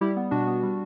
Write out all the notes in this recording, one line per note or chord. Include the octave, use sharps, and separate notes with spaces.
G3 E4 G4
B3
B2 D4 F#4
B3
G3